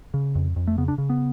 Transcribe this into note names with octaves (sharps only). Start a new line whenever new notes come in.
C#3
F2
F2
A3
C#3 B3
D4
C#3
B3